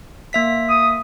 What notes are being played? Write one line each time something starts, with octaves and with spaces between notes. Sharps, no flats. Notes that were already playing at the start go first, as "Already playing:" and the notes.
A#3 E5 B6
D#6